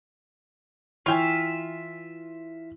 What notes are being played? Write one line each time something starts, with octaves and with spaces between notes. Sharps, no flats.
E3 F4 C#5 E5 G5 G#5